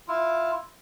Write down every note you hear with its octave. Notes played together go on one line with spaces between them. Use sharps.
E4 F4